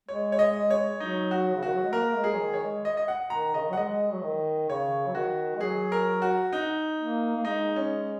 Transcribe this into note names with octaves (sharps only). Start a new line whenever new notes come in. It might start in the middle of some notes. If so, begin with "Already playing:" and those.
G#3 C#5
C#5
D#5
C#5
F#3 D#4
F#4
C#3
D#3 F#4
F#3
G#3
A#3 A#4
G#3
G#4
F#3
D#3
C#5
G#3
D#5
D#5
F#5
D#3 A#5
C#3 D#5
D#3
F#3
F#5
G#3 D#5
F#3
D#3
C#3 C#5
F#3
D#3 F#4
G#3
F#3 G#4
A#4
F#4
D#4
A#3
A#3
G#3 D#4
C#4